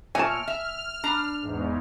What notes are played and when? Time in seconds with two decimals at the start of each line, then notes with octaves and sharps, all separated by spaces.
0.15 A#2 C#5 E5 G#5 A5 F6
0.48 E5
1.04 D4 A#5
1.42 E2 G#2